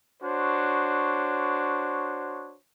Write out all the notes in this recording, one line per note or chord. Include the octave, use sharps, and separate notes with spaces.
D4 F#4 C5 C#5